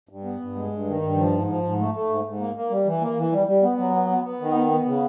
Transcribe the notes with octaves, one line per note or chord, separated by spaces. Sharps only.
G2
B3
G2
G#3
G2
D#3
G2
F3
G#2
F3
G#2
A3
A3
G#2
G#2
A#3
A#3
G3
E3
A#3
E3
G3
G3
B3
F#3
B3
B3
B3
D#3
B3
B3
C#3